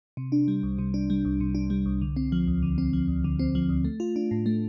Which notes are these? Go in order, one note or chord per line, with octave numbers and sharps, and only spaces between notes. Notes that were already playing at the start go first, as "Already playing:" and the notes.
C3
D4
G3
C2
C3
D4
G3
C2
C3
D4
G3
C2
D3
C4
F3
D2
D3
C4
F3
D2
D3
C4
F3
D2
A3
F4
D4
A2
A3